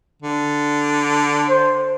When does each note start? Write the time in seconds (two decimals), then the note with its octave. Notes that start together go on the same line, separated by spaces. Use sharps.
0.23 D3
1.49 C5